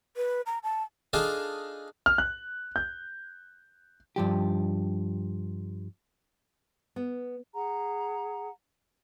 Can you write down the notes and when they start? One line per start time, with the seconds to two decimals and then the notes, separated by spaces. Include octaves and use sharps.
0.17 B4
0.46 A#5
0.63 A5
1.13 D4 D#4 F4 G#4 A4
2.06 F6
2.18 F#6
2.76 G6
4.16 G2 F3 G4
6.96 B3
7.54 G#4 F#5 A#5